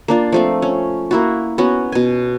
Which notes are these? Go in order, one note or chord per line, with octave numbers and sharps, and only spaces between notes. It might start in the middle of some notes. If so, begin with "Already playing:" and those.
A#3 D4 F4
F3 A3 C4
C#4
A#3 E4 F#4
B3 C#4 F#4
B2 G#5